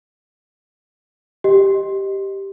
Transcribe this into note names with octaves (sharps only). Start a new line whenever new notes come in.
G4 D#5